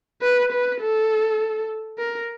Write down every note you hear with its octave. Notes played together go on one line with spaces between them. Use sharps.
B4
B4
A4
A#4